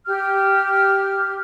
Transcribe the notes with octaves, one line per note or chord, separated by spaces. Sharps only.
G4 F6